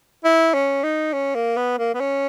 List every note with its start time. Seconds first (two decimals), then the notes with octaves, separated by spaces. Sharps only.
0.25 E4
0.54 C#4
0.83 D#4
1.13 C#4
1.35 A#3
1.57 B3
1.79 A#3
1.95 B3
2.00 C#4